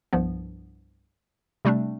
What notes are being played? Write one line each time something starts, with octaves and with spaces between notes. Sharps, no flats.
C2 G2 F3 B3
C3 G3 A3 C4 D4